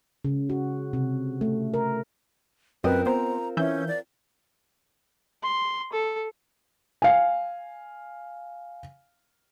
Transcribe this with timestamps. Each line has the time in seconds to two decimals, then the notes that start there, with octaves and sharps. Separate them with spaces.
0.25 C#3
0.50 F#4
0.93 C3
1.41 A3
1.74 A#4
2.84 F#2 C4 F4 A#4 B4 D#5
3.06 B3 C5 A#5
3.57 E3 C#4 E5 G6
3.88 D5
5.43 C6
5.93 A4
7.02 F5 G#5